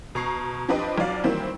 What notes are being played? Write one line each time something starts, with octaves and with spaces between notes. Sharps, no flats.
B2 A#5 C#6 C7
F3 C4 D4 G4 B4 D#5
B1 F3 F#3 D5 F5
D#3 E3 F#3 G3 A#3 C4